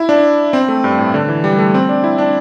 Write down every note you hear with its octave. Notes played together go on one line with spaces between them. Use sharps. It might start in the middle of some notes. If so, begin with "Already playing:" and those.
Already playing: E4
D4
C4
A3
G2
A2
D3
E3
G3
A3
C4
D4
E4
D4